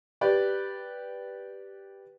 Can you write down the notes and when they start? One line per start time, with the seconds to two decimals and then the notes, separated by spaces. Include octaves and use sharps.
0.21 G4 B4 D5